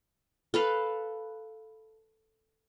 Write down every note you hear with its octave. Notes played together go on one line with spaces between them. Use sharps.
A4 B4 F5